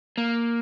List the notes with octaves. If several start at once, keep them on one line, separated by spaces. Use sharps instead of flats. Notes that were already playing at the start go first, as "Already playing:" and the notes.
A#3